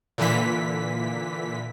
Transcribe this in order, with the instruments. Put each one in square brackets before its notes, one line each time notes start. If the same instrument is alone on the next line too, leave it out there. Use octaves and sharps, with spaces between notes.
[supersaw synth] A#2 D3 E3 B6